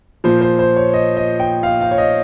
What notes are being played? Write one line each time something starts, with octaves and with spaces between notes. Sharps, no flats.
A#2 F3 C5
C5
C5
C#5
D#5
D#5
G5
F5
F5
C#5
D#5